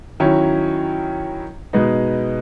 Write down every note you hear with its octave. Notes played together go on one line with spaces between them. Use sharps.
D#3 F#3 C#4 E4
B2 G#3 B3 D#4